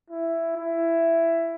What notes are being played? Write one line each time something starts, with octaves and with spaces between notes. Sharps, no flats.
E4
E4